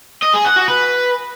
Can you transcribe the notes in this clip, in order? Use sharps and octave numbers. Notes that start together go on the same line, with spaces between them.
D#5
G#4
F#5
F#4
B4